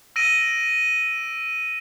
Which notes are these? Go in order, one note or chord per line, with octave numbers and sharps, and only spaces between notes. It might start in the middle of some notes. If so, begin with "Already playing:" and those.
E6 A#6 D7 D#7